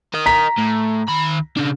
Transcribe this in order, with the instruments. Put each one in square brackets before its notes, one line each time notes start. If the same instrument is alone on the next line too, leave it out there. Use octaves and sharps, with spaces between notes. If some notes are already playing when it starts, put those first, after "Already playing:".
[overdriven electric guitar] A#4 D#5
[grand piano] A#5 B6
[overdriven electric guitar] A2
D#3 B5
C#3 D4